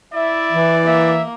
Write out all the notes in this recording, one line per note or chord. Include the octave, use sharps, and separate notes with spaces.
E4 D5 E5
E3
A#3 E5